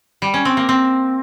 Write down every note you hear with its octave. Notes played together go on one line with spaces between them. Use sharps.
G3
C#4
C4
A#3
C4